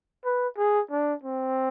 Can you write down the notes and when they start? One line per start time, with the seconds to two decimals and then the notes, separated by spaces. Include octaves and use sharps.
0.25 B4
0.58 G#4
0.91 D4
1.23 C4